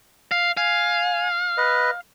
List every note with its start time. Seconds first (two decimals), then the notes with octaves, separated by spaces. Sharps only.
0.31 F5
0.57 F5 G#5
1.57 B4 D#5